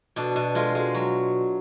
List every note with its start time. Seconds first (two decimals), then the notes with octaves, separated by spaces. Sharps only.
0.16 B2 D4
0.36 B2
0.55 G#3 F4
0.75 G#3
0.94 F#3